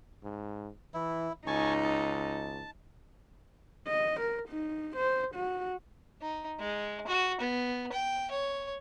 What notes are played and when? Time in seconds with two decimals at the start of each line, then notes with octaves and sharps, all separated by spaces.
0.24 G#2
0.94 E3 E4
1.47 C#2 D#4 G#5 A5 C#6
1.84 A5
3.88 D#5
4.20 A#4
4.49 D#4
4.97 C5
5.35 F#4
6.22 D#4
6.59 G#3
7.07 F#4
7.41 B3
7.92 G5
8.30 C#5